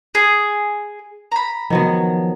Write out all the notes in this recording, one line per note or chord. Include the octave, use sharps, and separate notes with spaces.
G#4
A#5 B5
D#3 F3 F#3 B3